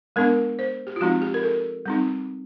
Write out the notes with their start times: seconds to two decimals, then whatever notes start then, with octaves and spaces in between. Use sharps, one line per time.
0.16 G#3 B3 D4 A#4
0.59 C5
0.87 G4
0.96 F4
1.00 F3 G#3 C4 D#4 F#4
1.22 G4
1.34 A#4
1.43 A4
1.85 G3 C4 D#4